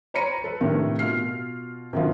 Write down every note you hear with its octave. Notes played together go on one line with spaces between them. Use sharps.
C5 C#5 A#5 B5 C#7 D#7
A4 B4
A2 C3 D#3 D4
B2 F4 F6 C7
F#2 B2 D3 D#3 F3